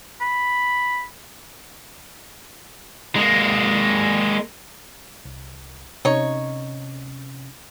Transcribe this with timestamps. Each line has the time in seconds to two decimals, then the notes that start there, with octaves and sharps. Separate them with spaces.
0.21 B5
3.16 G#3 A#3
5.25 C2
6.05 C3 C#4 D#4 C#5